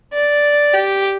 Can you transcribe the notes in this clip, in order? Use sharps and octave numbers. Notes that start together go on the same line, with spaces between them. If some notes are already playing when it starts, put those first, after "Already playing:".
D5
G4